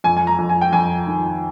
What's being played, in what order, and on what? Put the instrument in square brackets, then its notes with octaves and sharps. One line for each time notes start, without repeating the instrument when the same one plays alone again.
[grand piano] F2 G#5
G#5
A#5
F2
G#5
G5
F2 G#5
D#3